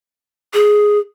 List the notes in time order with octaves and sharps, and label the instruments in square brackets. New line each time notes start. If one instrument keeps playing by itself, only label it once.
[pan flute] G#4